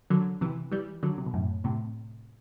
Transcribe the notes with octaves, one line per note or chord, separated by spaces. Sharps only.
D3 F#3
C3 E3
E3 G3
D3 F#3
C3
B2
F#2 A2
A2 C3